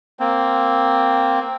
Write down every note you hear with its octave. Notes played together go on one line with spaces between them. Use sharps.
A#3 C4